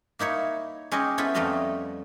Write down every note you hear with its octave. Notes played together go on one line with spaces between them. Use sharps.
A#3 D#4 E4 C#5
G#3 C#4 G4 C#5 D#5
B3 C#4 E4 A4 B4 C5
F2 G3 A3 F4 D#5 F5